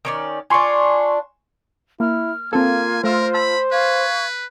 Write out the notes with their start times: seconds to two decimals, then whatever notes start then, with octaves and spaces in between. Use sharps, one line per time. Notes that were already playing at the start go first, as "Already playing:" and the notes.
0.05 D#3 C#4 D5
0.50 D4 F4 G#5 C6 C#6
2.00 A#3 E4 F6
2.53 A#3 C4 F4 A4 G#5
3.04 A3 A#4 C5 F5 E6
3.34 A5 B5 E6
3.72 B4 F5 C#6 G#6